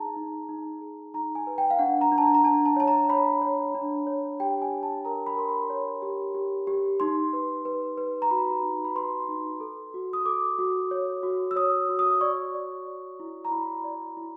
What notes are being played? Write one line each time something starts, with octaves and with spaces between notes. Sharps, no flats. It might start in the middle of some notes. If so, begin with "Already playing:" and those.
Already playing: D#4 G#4 A5 A#5
D#4
D#4
G#4
D#4 A#5
G#5
B4
G5
F5
D4 F#5
A#5
D4
A5
A#5
A#5
D4 A5
A5
C#5 A5
A#5
C#5 B5
C#5
D4
C#5
G4 G5
G#5
G4
A5
A#4 A#5
B5
A#4 C6
B5
C#5
G4
G4
G4
D#4 C6
B4
B4
B4
A#5
F#4 B5
D#4
B5
B4 C6
D#4
A4
F#4
D#6
A4 D6
F#4
C#5
F#4
E6
C#5 D#6
F#4
D#6
D5 C#6
D5
D5
E4
A#5
E4 B5
D5
E4